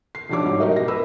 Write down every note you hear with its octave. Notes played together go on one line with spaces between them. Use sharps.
C7
B1 F3 D4 G4 C#5 D6
G#2 F#3 G3
D#4 F#4 G4 A#4 D#5
B2 A#6
A#4 B4 B5 E6